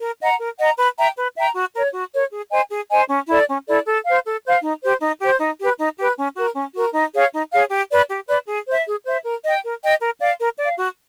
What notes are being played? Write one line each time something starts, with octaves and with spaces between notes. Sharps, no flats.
A#4
D#5 F#5 A#5
A#4
D#5 F#5 A#5
B4
E5 G5 A#5
B4
E5 G5 A#5
F#4
A#4 C#5
F#4
A#4 C#5
G#4
C5 D#5 G#5
G#4
C5 D#5 G#5
C#4
E4 A4 D5
C#4
E4 A4 D5
A4
C5 F5
A4
C5 F5
D#4
G4 C5
D#4
G4 C5
D#4
G4 B4
D#4
G4 B4
C#4
F#4 A#4
C#4
F#4 A#4
D#4
G#4 C#5 F5
D#4
G#4 C#5 F5
G4
B4 D5
G4
B4 D5
G#4
C5 E5
G#4
C5 E5
A#4
D#5 G5
A#4
D#5 G5
A#4
D5 F5
A#4
D5 F5
F#4